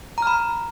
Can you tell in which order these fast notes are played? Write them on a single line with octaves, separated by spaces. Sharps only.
A#5 F6 B5